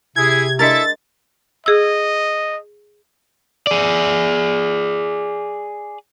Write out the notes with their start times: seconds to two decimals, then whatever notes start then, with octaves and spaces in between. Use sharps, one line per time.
0.16 C3 E4 G#4 G#6
0.59 G#3 D4 E4 A4 A#4 E5 A6
1.66 G#4 D#5 E6
3.67 G#4 D5